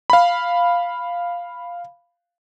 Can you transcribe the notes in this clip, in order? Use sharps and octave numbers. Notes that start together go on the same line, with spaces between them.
F5 B5